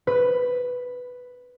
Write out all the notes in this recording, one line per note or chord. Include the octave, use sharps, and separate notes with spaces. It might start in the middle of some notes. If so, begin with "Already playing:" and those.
B4